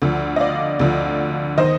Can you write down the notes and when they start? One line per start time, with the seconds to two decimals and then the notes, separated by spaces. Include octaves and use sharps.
0.02 D2 D3 F3
0.36 D#5
0.40 D5 F5
0.80 D2 D3 F3
1.58 D#3 C5 D#5